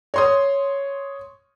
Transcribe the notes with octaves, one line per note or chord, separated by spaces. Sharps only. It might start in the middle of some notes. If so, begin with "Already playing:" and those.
C#5 C6 D#6